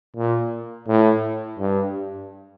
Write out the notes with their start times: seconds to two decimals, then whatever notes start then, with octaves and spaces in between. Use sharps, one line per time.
0.16 A#2
0.88 A2
1.59 G2